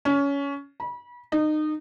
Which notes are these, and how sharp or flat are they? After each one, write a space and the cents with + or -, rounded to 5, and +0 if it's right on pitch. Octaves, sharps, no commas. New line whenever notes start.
C#4 +20
B5 -30
D#4 -25